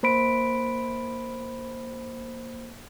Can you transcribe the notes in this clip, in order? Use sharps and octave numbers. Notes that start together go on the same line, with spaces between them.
A#3 C5 B5 B6 D7